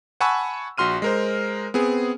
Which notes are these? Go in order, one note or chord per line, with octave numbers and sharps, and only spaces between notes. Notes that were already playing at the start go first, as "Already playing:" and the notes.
F#5 G#5 A5 B5 C#6 E6
A#1 F#4 C6 F6 D#7
G#3 A#4 C5
B3 C4 G#4